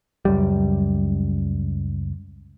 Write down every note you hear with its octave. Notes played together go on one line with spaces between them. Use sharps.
C#2 F#2 G3